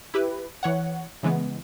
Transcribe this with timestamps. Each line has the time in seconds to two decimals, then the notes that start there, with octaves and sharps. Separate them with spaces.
0.14 E4 G4 B4
0.63 E3 C#5 F#5
1.23 C#3 E3 G#3 B3